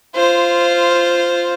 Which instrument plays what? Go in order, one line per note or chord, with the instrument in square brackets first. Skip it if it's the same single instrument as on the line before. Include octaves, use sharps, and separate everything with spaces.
[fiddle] F4 C5